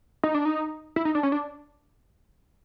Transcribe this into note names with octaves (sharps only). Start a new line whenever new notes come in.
D#4
D4
D#4
E4
D#4
D4
C#4
D4